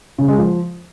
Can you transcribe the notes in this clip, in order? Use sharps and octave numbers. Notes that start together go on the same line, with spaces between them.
C#3
G#3
F3